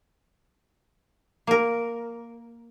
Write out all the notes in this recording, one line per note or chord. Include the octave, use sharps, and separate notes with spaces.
A#3 A#4